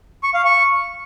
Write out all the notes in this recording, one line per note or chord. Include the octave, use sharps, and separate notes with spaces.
C#6
F5
C#6